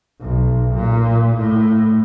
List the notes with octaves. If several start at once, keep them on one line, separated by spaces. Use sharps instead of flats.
B1
A#2
A2